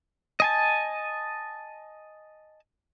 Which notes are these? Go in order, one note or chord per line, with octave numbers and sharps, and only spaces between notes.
D#5 G#5 A5